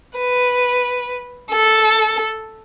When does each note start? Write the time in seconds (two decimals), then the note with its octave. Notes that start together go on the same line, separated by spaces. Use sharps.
0.19 B4
1.51 A4